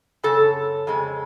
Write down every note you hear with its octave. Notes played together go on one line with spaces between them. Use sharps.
F#2 C#3 A4
F2 C#3 G#3